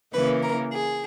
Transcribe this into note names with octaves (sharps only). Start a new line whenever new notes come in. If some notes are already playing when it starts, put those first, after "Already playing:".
C#3 E3 A#3 B4
A#4
G#4